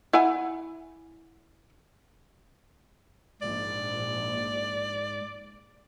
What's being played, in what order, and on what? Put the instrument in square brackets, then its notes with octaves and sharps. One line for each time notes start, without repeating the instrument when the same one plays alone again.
[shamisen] E4 F#5 G#5
[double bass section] A#1 [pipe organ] G#2 [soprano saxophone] D5